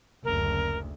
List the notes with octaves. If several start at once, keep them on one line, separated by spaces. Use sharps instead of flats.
F#1 D2 A#4